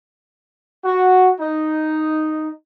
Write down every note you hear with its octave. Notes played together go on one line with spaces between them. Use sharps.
F#4
D#4